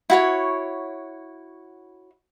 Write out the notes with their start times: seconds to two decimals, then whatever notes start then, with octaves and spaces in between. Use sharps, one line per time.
0.10 E4 F#4 C#5